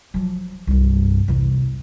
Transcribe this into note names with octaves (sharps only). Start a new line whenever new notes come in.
F3 F#3
C2 G2
E2 C3